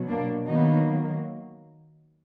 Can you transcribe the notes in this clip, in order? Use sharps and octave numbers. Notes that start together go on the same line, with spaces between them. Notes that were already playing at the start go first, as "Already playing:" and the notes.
Already playing: B2 F#3
A#3 D4
D#3 F#3 A#3 B3 D#4